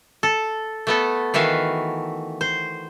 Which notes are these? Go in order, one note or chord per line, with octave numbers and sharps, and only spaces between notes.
A4
A3 B3 A4
D#3 E3 F#4 E5 F5
C5